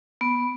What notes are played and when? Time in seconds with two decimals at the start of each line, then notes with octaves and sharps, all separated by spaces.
0.21 B3